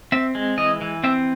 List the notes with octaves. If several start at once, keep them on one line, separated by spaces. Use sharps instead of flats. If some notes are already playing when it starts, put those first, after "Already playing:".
C4 E5
G#3
E3 D#5
E3
C4 E5